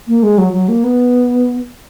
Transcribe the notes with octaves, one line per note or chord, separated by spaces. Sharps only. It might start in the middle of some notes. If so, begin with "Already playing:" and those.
A#3
G#3
F#3
F#3
A#3
B3